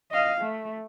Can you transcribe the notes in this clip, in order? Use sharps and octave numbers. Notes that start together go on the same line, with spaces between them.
D#5 F5
A3